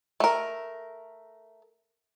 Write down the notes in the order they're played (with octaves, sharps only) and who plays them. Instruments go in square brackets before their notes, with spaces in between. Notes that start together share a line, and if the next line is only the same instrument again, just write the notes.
[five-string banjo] A3 A#4